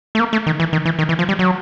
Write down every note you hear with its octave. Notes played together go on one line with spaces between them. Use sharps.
A3
A#3
A3
D#3
E3
D#3
E3
D#3
E3
F3
G3
F#3